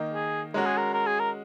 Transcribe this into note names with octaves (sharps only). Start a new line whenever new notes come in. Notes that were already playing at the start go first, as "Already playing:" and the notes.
Already playing: D#3 A#3 D#4
G#4
G#3 C#4 F#4 A#4
G#4
A#4
A#4
G#4
A#4